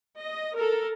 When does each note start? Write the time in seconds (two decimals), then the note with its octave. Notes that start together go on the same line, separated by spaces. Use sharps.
0.19 D#5
0.56 A4 A#4